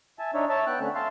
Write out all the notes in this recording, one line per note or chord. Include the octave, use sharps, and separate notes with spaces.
E5 G#5 A5
D4 D#4 C#5 E5
C#5 E5 A5
B3 G5 F#6
D3 A3 C4 C#4
E5 F5 A5 C6